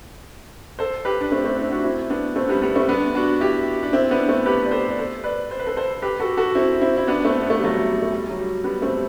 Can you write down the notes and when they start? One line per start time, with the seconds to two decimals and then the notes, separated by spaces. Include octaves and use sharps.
0.79 A4 C5
1.05 G4 B4
1.21 D4
1.32 A3 C4
1.44 A3 C4
1.58 C4 E4
1.71 D4 F#4
1.84 C4 E4
2.10 B3 D4
2.36 A3 C4
2.49 G3 B3
2.62 G3 B3
2.76 A3 C4
2.88 B3 D4
3.15 D4 F#4
3.40 E4 G4
3.83 D4
3.93 C4 E4
4.10 B3 D4
4.28 A3 C4
4.46 G4 B4
4.65 D5
4.71 A4 C5
4.89 D5
4.98 A4 C5
5.24 B4 D5
5.51 C5
5.59 B4
5.66 A4 C5
5.76 A4 C5
6.02 G4 B4
6.20 F#4 A4
6.37 F#4 A4
6.55 C4 E4
6.81 C4 E4
6.97 E4
7.07 B3 D4
7.25 A3 C4
7.42 B3
7.50 A3
7.57 G3
7.64 F#3 A3
8.02 A3
8.12 G3
8.30 F#3
8.39 G3
8.64 G3 B3
8.82 A3 C4